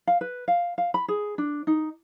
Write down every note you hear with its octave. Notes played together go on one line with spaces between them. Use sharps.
F5
B4
F5
F5
B5
G#4
D4
D#4